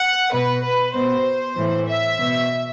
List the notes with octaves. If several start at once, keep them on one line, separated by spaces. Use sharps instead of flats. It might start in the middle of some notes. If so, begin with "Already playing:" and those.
Already playing: F#5
B2 B4
B4
B2 C5
A2 E3
E5
B2